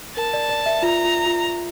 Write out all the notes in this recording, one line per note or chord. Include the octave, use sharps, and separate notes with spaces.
A#4 A5
D5
D5
E5
F4 A#5
F4
F4